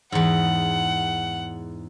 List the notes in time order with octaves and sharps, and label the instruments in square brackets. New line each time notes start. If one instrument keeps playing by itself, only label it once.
[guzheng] E2 G#2 [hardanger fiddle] F#5